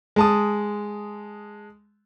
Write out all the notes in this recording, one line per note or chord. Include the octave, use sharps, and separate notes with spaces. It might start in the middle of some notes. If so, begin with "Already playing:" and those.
G#3 A5 D#6